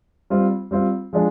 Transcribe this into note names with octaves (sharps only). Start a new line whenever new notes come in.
G3 C4 F4
G3 C4 F4
F3 G#3 D4